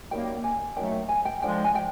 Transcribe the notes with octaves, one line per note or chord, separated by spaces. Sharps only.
F#2 D#3 G3 A#3 G5
G#5
F#2 D#3 F#3 A3 G5
G#5
G5
D3 F3 G#3 G5
G#5
G5